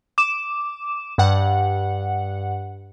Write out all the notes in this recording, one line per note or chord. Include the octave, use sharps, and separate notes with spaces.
D6 E7
G2 F#5